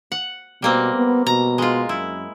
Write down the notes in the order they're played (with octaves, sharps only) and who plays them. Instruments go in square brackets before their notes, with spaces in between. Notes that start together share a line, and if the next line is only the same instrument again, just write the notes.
[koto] F#5
[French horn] B2 [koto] G3 A#3 C4
[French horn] B3
[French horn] B2 [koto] A#5
[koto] G#3 F4
[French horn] F#2 [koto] E4